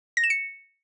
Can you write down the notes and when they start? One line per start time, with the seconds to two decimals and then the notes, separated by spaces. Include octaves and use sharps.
0.17 A#6
0.24 E7
0.30 C#7